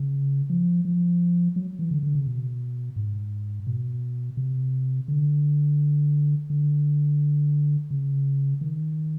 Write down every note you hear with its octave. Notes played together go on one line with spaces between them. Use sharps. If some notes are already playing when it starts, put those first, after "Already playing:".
Already playing: C#3
F3
F3
F#3
E3
D3
D3
C#3
B2
G#2
B2
C3
D3
D3
C#3
D#3